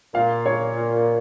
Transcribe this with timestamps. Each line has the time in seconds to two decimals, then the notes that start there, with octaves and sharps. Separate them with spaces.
0.14 A#2 F5
0.46 C#5